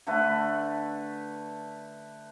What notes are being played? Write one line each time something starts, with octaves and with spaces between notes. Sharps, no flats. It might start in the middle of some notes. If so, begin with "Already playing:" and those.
D3 A3 B4